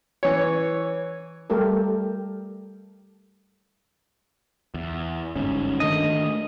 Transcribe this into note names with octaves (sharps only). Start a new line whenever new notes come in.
E3 C#5
G3 A3 G4 A4 A#4
E2
G1 G#2 C#4
D#3 A3 D4 D#5